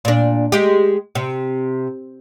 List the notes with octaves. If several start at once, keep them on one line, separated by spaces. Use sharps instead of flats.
A#2 D4
G#3 G4
C3